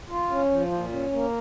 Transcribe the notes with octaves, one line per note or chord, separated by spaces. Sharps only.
F4
C#4
F3
A#2
C#4
A#3